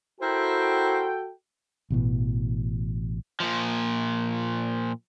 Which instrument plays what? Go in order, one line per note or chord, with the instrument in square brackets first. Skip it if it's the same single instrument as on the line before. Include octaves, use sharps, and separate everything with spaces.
[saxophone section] E4 A#4 C5 [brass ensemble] F#4 A4 G5
[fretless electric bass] A1 B2 E3
[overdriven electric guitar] A#2 F3